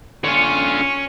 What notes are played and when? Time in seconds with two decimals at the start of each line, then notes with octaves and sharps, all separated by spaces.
0.24 D3 F4 C#5 G#5